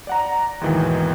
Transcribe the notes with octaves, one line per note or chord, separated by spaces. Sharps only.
D5 F#5 A#5
D#2 G#2 B2 D#3 E3